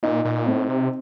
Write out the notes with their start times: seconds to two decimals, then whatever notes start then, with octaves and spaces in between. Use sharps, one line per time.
0.03 A#2 D#4
0.25 A#2
0.46 A2 C4
0.69 C3